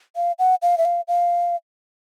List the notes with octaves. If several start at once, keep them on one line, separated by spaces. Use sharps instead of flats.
F5
F#5
F5
E5
F5
F5